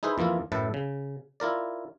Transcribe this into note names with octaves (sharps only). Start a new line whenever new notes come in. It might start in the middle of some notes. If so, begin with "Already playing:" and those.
D#4 E4 G#4 B4 C5
F2 E3 A#3 E4 F4
F#2 A2 B4 E5 A5
C#3
E4 F4 A#4 D5